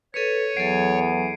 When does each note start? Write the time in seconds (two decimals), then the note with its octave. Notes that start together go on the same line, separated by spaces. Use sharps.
0.14 A4 B4 C#5 C#7 D#7
0.57 E2 F#3 A4 G#6 C7 D7